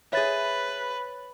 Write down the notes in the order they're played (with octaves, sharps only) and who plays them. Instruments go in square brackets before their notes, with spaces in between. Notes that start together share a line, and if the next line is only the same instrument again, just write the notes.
[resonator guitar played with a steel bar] G#4 E5 [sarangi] B4 [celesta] C#5 A6